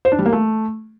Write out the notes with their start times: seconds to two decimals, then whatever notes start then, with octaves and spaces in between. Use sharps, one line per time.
0.05 C5
0.12 D4
0.19 G3
0.26 A#3
0.33 A3